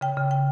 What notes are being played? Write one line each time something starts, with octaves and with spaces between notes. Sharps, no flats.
C#3 G5
C#3
G5